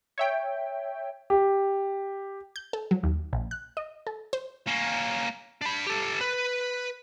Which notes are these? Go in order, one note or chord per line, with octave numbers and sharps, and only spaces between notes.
C#5 E5 G5
G4
G6
A4
F#3
D#2
A#1
F#6
D#5
A4
C5
A#3 C#4
D4 B5
G4 A4
B4